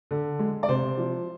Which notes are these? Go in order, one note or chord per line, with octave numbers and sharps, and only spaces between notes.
D3
G#3
D5
C3 C5
F3